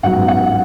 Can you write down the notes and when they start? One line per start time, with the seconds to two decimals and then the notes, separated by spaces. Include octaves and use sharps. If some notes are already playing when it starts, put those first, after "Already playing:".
0.03 A1 G#2 F#3 B3 F#5
0.28 F#5